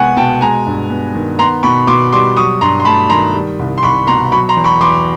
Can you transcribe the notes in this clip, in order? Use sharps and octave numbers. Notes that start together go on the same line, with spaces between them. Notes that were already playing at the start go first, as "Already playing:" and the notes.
Already playing: C2 G#3 B3 F#5 G#5 C#6
B2 G5 A5
G#3 G#5 A#5
G2
B3
D#3
B3 A#5 C6
B2 B5 C#6
B2 C6 D6
G3 C6 D6
F#3 C#6 D#6
G2 A#5 C6
C6
A3 A5 B5
D#3 A#5 C6
G3
C2
C6
C2 B5 C#6
B2 A#5 C6
F#3 B5 C#6
A#5 C6
E2
B5 C#6
E2 C6 D6